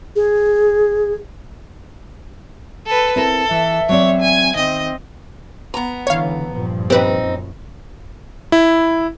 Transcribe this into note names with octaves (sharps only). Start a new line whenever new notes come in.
G#4
A4 B4
C4 E4 A4 A#4
E3 E5
F#3 C4 C#5 D5
G#5
D#3 C4 D#5
B3 A#5
C#2 D3 E3 C#5 F5
G2 A#2 F3
C4 D#4 G4 B4
F#2
E4